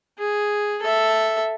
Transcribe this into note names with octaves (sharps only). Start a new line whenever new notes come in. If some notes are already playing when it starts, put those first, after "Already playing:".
G#4
A4 E5